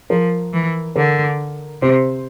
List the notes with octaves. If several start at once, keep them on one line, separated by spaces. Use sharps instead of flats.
F3 A#4
E3
D3 A#4
C3 C5